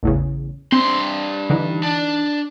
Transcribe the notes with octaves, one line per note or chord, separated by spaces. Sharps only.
A1 E2 C#3
G2 C4 C6
D3 E3 D#4
D4